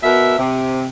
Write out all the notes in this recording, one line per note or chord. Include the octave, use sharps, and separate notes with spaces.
B2 A#4 E5
C3